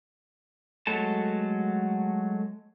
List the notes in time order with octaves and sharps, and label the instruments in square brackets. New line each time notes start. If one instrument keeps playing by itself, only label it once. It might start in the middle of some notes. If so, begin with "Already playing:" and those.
[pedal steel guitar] F#3 G#3 A3 A4 A5